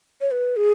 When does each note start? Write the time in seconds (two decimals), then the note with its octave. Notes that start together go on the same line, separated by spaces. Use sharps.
0.21 C#5
0.31 B4
0.57 G#4